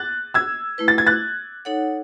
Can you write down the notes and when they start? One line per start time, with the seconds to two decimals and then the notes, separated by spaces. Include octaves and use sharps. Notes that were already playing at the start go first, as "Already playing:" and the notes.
Already playing: F#6 A6
0.34 E6 G#6
0.78 A3 E4 B4
0.88 A6
0.98 G#6
1.07 F#6 A6
1.65 D#4 A4 C#5 F#5